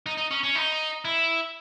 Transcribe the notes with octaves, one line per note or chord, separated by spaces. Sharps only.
D#4
D#4
C#4
C#4
D#4
E4